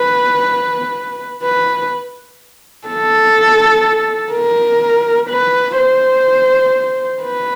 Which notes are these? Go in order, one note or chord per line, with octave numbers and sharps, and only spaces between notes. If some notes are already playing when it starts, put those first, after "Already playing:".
Already playing: B4
B4
A4
A#4
B4
C5
B4